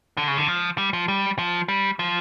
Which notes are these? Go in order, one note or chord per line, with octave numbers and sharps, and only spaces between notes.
D3
C#3
D3
F3
G3
F3
G3
F3
G3
F3